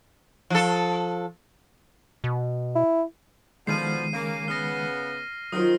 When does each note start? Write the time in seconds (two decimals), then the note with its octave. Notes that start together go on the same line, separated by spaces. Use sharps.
0.50 F3 A4
2.24 B2
2.75 E4
3.67 B2 D3 D#3 F3 G#3 C7 D#7
4.14 C#3 A#3
4.48 C#3 B3 F6 A#6
5.52 D#3 F#3 F4 C5 D#6 F6